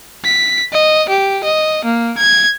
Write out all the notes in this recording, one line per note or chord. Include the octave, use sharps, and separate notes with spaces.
B6
D#5
G4
D#5
A#3
G#6